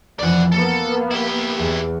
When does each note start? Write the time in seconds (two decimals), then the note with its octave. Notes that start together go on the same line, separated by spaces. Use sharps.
0.19 F1 F2 E3 D5 F#5
0.52 A#3 B3 A4
1.11 E4 G4
1.57 E2